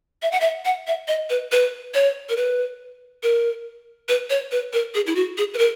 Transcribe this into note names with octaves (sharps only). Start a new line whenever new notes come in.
E5
F#5
E5
F#5
E5
D#5
B4
B4
C#5
A#4
B4
A#4
B4
C#5
B4
A#4
G#4
E4
F#4
G#4
B4
A#4